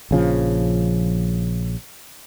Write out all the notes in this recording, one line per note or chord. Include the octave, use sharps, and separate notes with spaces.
A#1 C#3 F3